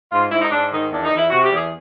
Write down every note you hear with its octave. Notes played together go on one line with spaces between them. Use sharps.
G#2 F4
G#2 E4
D#4
G#2 D4
D#3 D#4
E2 D4
D#4
E2
E4
C3 F#4
G4
E2
G#4